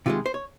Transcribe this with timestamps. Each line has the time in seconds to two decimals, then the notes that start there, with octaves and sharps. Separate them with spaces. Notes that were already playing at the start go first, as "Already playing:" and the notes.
0.06 C3 D#3 G#3 F4
0.26 C5
0.34 C#5